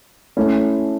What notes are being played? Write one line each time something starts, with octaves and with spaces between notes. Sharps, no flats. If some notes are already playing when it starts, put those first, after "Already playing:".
A3 C#4 E4